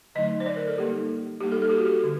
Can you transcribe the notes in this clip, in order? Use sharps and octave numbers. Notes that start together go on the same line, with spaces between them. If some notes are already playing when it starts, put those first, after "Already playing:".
D3 F#3 A3 D#4 D#5
C5
D5
A#4
A4
G3 A#3 D#4 G4
G3 A#3 D#4 G4
A4
A4
G4
F#4
G4
D3